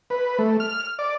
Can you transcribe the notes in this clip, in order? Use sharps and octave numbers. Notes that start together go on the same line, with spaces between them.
B4
A3
F6
D5